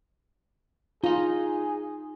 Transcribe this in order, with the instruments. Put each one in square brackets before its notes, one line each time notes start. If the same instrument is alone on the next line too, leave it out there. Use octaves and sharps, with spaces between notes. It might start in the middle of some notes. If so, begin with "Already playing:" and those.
[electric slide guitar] D#4 A#5 [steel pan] F4 [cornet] G#4